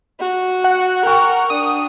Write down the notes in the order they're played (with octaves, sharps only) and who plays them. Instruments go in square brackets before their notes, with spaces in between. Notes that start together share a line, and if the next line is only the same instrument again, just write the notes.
[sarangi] F#4
[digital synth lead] F#5
[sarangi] A#4 [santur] G5 C#6
[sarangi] D4 [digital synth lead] D#6